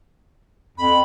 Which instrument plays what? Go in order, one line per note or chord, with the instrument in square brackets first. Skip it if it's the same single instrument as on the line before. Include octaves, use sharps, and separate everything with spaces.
[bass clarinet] F2 [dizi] B5